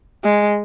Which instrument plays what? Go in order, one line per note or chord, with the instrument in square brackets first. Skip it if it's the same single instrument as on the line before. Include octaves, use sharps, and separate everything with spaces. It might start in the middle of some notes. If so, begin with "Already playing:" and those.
[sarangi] G#3